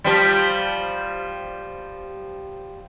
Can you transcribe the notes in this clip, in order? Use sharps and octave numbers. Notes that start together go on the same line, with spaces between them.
F3 G3